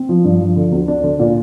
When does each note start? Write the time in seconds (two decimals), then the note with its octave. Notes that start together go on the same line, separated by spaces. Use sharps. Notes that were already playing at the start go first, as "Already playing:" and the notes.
Already playing: C4
0.09 F3
0.25 G2
0.41 F3
0.56 D3
0.72 D2
0.88 D4
1.04 D3
1.20 A#2